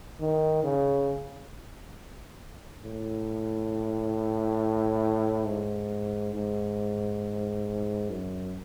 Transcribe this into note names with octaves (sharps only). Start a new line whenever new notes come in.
D#3
C#3
A2
G#2
G#2
F#2